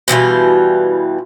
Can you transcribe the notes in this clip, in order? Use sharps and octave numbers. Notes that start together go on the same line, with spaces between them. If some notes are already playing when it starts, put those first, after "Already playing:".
B2 E3 G3 F4